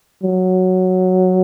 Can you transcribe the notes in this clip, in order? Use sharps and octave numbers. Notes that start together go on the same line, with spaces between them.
F#3